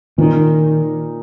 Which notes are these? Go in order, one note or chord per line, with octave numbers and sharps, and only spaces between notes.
A#2 D#3 A#3 D#4